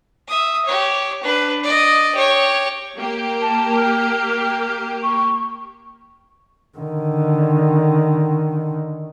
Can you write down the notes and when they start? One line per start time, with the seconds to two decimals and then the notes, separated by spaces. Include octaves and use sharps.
0.27 E5 D#6
0.65 G4 C#5
1.23 D4 B4
1.64 D5 D#5
2.15 G4 C#5
2.96 A#3 G4
3.42 A5
3.77 F6
5.03 C#6
6.78 D3 D#3